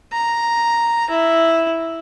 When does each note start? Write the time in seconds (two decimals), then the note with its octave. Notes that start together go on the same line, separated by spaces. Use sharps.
0.13 A#5
1.10 E4